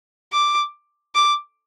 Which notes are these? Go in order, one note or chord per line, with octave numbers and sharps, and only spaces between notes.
D6
D6